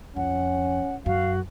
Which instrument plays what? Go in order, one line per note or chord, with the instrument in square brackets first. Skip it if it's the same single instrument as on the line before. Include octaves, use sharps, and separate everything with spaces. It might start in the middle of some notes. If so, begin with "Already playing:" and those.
[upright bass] F2 [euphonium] C#4 [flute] F#5
[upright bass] F#2 [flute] F#4 [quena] F5